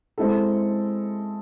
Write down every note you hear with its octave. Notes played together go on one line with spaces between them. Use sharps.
G#3 C4 E4 A4